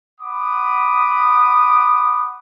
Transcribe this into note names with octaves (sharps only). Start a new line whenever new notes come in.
F#5 B5 D6 D#6